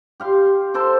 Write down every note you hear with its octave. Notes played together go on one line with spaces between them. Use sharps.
G4 F5 C6
A4 C5 C6 D6